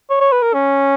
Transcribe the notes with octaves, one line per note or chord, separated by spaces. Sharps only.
C#5
C#5
B4
A#4
C#4